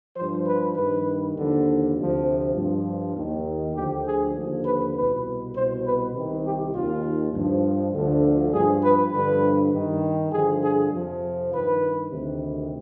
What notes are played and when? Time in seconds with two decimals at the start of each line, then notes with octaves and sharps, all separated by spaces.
0.17 G2 F3 C5
0.47 B4
0.76 G2 D#3 B4
1.36 D#2 D3 F3
1.96 D2 C3 F3
2.56 G2 F3
3.15 D#2 D#3
3.75 D2 D3 F3 G4
4.05 G#4
4.35 D#2 D3 F3
4.65 B4
4.95 C2 B2 B4
5.54 C2 B2 C5
5.85 B4
6.14 C2 C3 D#3
6.44 G4
6.74 D#2 D#3 F4
7.34 G2 F3
7.94 D2 D3 F3
8.53 G2 F3 G#4
8.84 B4
9.13 G2 D3 F3 B4
9.73 G2 D#3
10.33 G2 D3 F3 G#4
10.62 G#4
10.92 F2 C3 F3
11.52 G2 D#3 B4
12.12 D2 C3 D#3